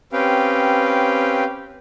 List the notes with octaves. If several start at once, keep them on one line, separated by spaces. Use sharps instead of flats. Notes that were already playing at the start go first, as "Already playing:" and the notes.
C4 C#4 G4 B4 F5 G5